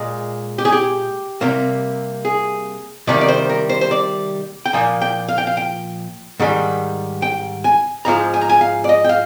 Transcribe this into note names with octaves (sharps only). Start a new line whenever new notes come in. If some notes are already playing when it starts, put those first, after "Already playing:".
Already playing: A#2 G#3
G4
G#4
G4
C3 G3 A#3
G#4
C3 D#3 G3 A#3 D5
D5
C5
A#4
C5
C5
D5
G5
A#2 F3 A#3 G#5
G5
F5
G5
F5
G5
G#2 D#3 G3
G5
G#5
G#2 F3 G#3 A#5
G#5
A#5
G#5
F5
D5
D#5
G5
F5